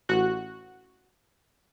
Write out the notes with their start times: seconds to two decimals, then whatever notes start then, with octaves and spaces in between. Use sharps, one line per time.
0.09 A1 F#4 F#6